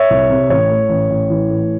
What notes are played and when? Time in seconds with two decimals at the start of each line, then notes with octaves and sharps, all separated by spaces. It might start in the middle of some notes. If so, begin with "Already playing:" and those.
Already playing: C#5 E5
0.10 C2
0.30 C3
0.50 A1 C#5
0.70 A2
0.89 A1
1.10 A1
1.30 E3
1.50 A2